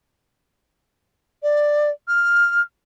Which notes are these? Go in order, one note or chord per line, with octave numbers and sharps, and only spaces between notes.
D5
F6